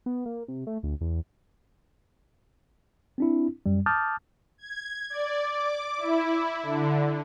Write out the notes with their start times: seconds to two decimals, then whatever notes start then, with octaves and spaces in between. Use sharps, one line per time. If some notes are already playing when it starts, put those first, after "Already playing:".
0.06 B3
0.26 A#3
0.48 C3
0.67 A3
0.83 D2
1.01 E2
3.18 C4 D4 E4
3.66 F#2 G3
3.86 A5 D6 D#6 F6 G6 A6
4.58 G#6
5.10 D5
5.49 D6
5.98 E4
6.63 D3